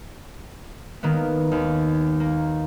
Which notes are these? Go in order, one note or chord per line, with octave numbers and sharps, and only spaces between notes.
D#3 A#3 B3
D#2
A#3